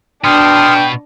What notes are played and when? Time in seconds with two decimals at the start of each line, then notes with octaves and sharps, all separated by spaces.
0.24 B2 B3 D4 G5 C6 D#6 F6